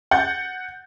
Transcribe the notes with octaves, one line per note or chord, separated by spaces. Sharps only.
F#5 G6 A6